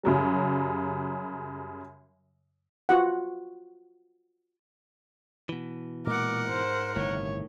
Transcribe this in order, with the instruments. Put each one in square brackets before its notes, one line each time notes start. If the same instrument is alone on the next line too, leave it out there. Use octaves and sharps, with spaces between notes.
[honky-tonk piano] F#2 C#3 F#3 G3
[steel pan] F4 F#4 F#5
[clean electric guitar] B2 E3
[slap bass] A#2 G#3 [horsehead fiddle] A#4 F#5 [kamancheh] D6
[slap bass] G#2 [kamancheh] C5
[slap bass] G1 C3 [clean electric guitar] A2 D#3 [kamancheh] C#5